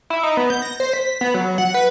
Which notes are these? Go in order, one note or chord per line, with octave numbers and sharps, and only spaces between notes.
E4
D#4
B3
G6
A#6
C5
B6
B3
F#3
F#5
B4